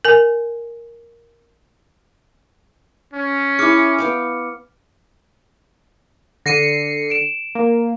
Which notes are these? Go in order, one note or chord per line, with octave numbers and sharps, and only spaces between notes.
A#4 G#5
C#4
E4 G#4 D6 F6 C#7
B3 F5 G5
D3 A#6 C7 C#7 D#7
D7 E7
A#3